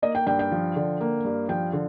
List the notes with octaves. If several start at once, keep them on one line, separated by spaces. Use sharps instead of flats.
A#3 D#5
G5
G2 G5
G5
F3
D3
A#3
G2
F3 G5
D3